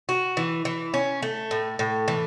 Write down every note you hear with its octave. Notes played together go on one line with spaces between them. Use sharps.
F#4
E3
E3
C#4
A3
A2
A2
E3